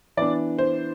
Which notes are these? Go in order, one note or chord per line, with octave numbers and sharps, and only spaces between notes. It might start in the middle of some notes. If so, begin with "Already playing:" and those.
E3 B3 D4 D5
C5